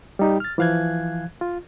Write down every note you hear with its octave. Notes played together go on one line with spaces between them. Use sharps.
G3 D#4 G4
F6 A6
E3 F3 F5 F#6 G#6
F4